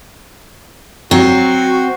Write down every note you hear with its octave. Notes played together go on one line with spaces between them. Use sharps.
F#3 C4 F#4